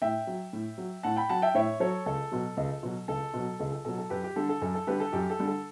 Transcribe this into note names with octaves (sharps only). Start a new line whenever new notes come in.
A2 E5 G5
F#3
A2
F#3
A2 F#5 A5
G5 B5
F#3 F#5 A5
E5 G5
A2 C#5 E5
F#3 A4 C#5
C#2 A4
B2 F#3
C#2
B2 F#3
C#2 A4
B2 F#3
C#2 A4
A4
B2 F#3 A4
A4
F#2 G4 B4
G4
D3 G3 A4
A4
F#2 A4
A4
D3 G3 G4 B4
A4
F#2 G4
A4
D3 G3
A4